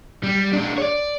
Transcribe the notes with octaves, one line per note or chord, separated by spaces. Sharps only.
G3
G#3 D4
C#5 D5